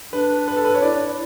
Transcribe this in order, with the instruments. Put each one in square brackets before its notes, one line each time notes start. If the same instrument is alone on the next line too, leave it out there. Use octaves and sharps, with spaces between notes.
[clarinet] D4 [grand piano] B4
[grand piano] B4
A4
B4
C#5
[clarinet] E4 [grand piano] D5